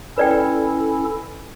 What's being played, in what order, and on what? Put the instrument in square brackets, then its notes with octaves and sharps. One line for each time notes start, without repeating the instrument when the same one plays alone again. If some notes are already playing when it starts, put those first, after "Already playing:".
[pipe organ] C#4 E4 A4 [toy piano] B4 D5 G5